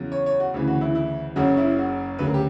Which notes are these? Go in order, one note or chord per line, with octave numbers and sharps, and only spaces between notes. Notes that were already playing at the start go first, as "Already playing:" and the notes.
Already playing: E2 C#3 F#3
C#5
C#5
F#4
D2 C#3 E3
F#4
E4
E4
F#1 F#2 C#3 F#3 F#4
E4
F#4
D2 C#3 F#3 B4
A#4
G4